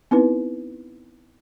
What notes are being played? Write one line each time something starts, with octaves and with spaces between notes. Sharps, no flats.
B3 C4 D#4 E4 B4